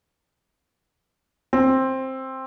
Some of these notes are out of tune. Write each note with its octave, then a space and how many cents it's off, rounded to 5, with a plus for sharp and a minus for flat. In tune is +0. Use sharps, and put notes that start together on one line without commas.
C4 +10